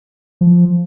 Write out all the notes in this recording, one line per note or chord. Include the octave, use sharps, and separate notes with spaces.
F3